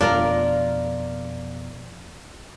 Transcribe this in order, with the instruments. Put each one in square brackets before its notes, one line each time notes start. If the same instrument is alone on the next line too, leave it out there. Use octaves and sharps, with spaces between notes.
[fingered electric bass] F2 B2 [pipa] D4 F4 [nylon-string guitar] A#4 D5